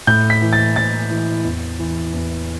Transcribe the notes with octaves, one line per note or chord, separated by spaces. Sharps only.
A2 G6
B6
E3
A6
A2 A6
E3
E2
E3
E2